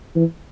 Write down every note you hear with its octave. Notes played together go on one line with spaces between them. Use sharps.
E3